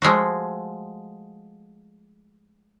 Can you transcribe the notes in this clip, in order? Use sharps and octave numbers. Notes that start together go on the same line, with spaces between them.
F3 G#3 A3 F#4